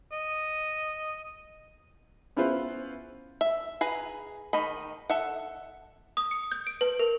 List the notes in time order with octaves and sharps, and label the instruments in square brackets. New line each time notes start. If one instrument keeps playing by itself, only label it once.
[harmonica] D#5
[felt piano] B3 C#4 E4 F4 B4 C5
[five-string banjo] E5
G#4 B4 A#5
D#3 D#5 B5
A4 E5 F#5
[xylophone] D#6
C#7
G6
D7
B4
A#4